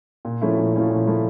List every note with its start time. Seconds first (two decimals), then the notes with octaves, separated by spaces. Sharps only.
0.25 A#2
0.42 F3 A3 C#4 E4
0.57 A#2
0.74 F3 A3 C#4 E4
0.90 A#2
1.07 F3 A3 C#4 E4